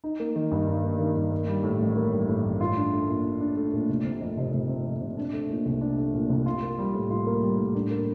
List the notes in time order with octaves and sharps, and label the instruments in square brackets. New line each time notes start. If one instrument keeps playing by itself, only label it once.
[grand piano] D#4
A#3
D#3
G2
D#4
A#3
D#3
G2
A#3
G3
A2
A1
A#3
G3
A2
A1
F4
D4
A3
A#2
F4
D4
A3
A#2
F1
C3
F2
F1
F1
C3
F2
F1
D4
A3
A#2
C2
D4
A3
A#2
C2
F4
A#3
G3
A2
F4
A#3
G3
A2
D4
A#3